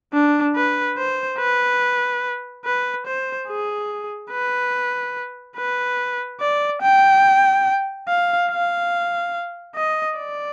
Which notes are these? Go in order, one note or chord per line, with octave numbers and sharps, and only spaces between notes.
D4
B4
C5
B4
B4
C5
G#4
B4
B4
D5
G5
F5
F5
D#5
D5